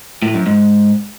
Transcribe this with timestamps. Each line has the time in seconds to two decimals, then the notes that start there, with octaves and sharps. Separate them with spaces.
0.22 A2
0.34 F#2
0.46 G#2